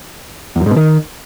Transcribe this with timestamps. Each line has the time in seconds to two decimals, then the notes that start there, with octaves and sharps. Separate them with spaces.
0.56 E2
0.61 F#2
0.66 G#2
0.71 B2
0.76 D#3